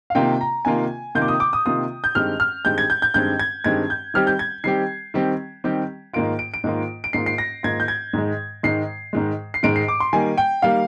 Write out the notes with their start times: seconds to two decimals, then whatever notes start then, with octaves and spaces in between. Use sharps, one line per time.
0.10 F5
0.15 C3 D#3 A#3 F4 G5
0.41 A#5
0.65 C3 D#3 A#3 F4 G#5
1.15 C3 D#3 A#3 F4 G6
1.22 D6
1.28 D#6
1.40 D6
1.53 D#6
1.66 C3 D#3 A#3 F4 D#6
2.04 G6
2.15 G2 D#3 G#3 C4 G4 F6
2.40 F6
2.65 G2 D#3 G#3 C4 G4 G6
2.78 G#6
2.90 G6
3.02 G6
3.14 G2 D#3 G#3 C4 G4 G6
3.39 G#6
3.64 G2 D#3 G#3 C4 G4 G#6
3.90 G6
4.14 D#3 G3 C4 G4 F6
4.27 G6
4.39 G#6
4.64 D#3 G3 C4 G4 C7
5.14 D#3 G3 C4 G4
5.64 D#3 G3 C4 G4
6.13 G#2 D#3 A#3 F4 D7
6.39 D7
6.54 D7
6.64 G#2 D#3 A#3 F4
7.04 D7
7.13 G#2 D#3 A#3 F4 C7
7.26 C7
7.38 A#6
7.63 G#2 D#3 A#3 F4 G#6
7.80 G6
7.88 G#6
8.13 G#2 D#3 G#3
8.63 G#2 D#3 G#3 C7
9.13 G#2 D#3 G#3
9.54 C7
9.63 G#2 D#3 G#3 D7
9.76 C7
9.88 D6
10.00 C6
10.13 D#3 G3 A#3 G#5
10.37 G5
10.62 D#3 G3 A#3 F5